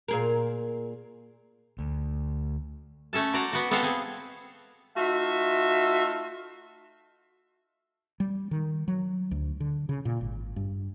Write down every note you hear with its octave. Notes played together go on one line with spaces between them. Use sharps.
A#2 G#4 A#4
D2
A3 C#4 A4 A5
F#4 C5 D5 A#5
B3 F#4
B3 C4 A4 C5 F5
C4 G#4
A3 D#4 F4 F#4 E5
G3
D#3
F#3
D2
D3
C#3
A#2
G#1
G2